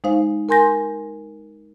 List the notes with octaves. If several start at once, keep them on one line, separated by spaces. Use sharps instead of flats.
G#3 D#4 C5 F5
A#4 G#5 C6 G6 A#6